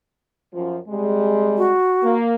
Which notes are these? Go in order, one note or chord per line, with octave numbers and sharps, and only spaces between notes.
F#2 F3
C3 G3 G#3
F#4
A#3